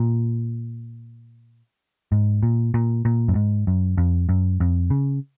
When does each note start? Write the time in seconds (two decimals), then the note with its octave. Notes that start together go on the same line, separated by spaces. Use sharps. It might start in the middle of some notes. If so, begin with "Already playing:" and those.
Already playing: A#2
2.12 G#2
2.43 A#2
2.74 A#2
3.05 A#2
3.28 F#2
3.35 G#2
3.67 F#2
3.98 F2
4.29 F#2
4.60 F2
4.90 C#3